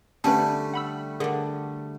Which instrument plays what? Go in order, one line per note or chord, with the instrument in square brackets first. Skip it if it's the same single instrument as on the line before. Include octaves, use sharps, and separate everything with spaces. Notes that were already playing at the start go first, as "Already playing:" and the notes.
[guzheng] D3 [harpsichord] G3 A3 [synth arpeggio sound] C4 C#4 B4 [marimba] A5
[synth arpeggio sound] F#5 B5 E6
[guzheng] D3 D4 [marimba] G#4 A#4 [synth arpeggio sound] D#6